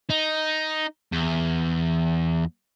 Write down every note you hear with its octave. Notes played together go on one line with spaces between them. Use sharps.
D#4
E2